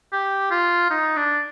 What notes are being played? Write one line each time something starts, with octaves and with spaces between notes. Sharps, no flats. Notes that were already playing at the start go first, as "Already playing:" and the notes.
G4
F4
D#4
D4